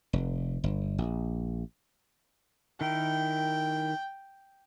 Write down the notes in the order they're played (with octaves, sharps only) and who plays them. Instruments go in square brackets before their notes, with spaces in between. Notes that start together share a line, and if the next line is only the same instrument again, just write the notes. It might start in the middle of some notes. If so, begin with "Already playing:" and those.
[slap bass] F1
G1
A#1
[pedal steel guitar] D#3 E4 A#4 [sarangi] G5